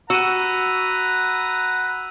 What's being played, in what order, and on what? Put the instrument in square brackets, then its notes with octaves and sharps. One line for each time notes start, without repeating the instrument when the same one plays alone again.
[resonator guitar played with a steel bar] F#4 [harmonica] B4 F#5 A#5 [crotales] E6 D#7